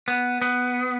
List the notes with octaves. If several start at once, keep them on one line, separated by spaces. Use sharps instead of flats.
B3
B3